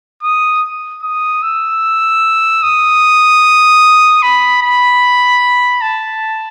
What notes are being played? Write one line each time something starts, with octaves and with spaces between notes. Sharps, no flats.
D#6
D#6
E6
D#6
B5
B5
A5